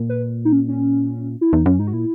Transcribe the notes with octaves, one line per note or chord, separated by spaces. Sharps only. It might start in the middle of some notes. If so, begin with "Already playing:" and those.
Already playing: A#2
B4
D#4
C#4
C#4
E4
E2 D#4
F#2 C#4
G#2 D#4
F#4
A#2 E4